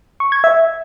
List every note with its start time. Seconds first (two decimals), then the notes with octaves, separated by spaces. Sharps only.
0.20 C#6
0.32 G#6
0.44 E5